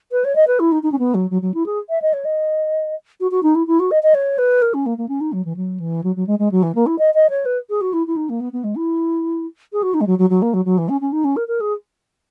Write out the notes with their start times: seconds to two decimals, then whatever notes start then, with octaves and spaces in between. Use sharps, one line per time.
0.11 B4
0.24 C#5
0.35 D#5
0.47 B4
0.59 E4
0.72 D#4
0.83 D#4
0.92 C#4
0.99 B3
1.14 F#3
1.30 F#3
1.42 F#3
1.54 E4
1.66 G#4
1.90 E5
2.02 D#5
2.13 C#5
2.25 D#5
3.20 F#4
3.31 F#4
3.43 D#4
3.55 E4
3.67 E4
3.79 F#4
3.91 D#5
4.03 D#5
4.14 C#5
4.38 B4
4.62 A#4
4.74 C#4
4.86 A#3
4.98 A#3
5.08 C#4
5.20 D#4
5.32 F#3
5.44 E3
5.56 F#3
5.79 E3
6.03 F#3
6.16 F#3
6.27 G#3
6.39 G#3
6.51 F#3
6.62 E3
6.75 A#3
6.86 E4
6.98 D#5
7.14 D#5
7.29 C#5
7.45 B4
7.69 G#4
7.81 F#4
7.93 E4
8.07 E4
8.16 D#4
8.29 A#3
8.40 B3
8.52 B3
8.64 G#3
8.75 E4
9.72 G#4
9.82 F#4
9.94 D#4
10.00 G#3
10.07 F#3
10.18 F#3
10.30 F#3
10.42 A#3
10.53 F#3
10.65 F#3
10.78 E3
10.89 C#4
11.01 C#4
11.12 D#4
11.24 C#4
11.36 A#4
11.47 A#4
11.60 G#4